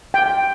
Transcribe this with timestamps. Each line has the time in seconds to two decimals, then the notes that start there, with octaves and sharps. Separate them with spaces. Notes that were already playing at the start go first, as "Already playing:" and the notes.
0.14 G5